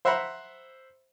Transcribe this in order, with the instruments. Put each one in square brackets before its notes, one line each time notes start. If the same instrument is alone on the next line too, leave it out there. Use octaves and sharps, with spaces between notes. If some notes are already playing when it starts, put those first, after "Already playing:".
[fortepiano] C5 E5 F#5 A#5 B5